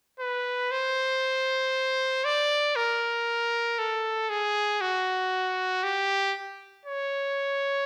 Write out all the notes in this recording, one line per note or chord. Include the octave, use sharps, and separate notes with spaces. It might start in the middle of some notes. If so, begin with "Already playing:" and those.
B4
C5
D5
A#4
A4
G#4
F#4
G4
C#5